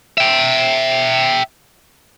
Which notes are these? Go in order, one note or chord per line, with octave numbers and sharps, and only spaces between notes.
E5 G5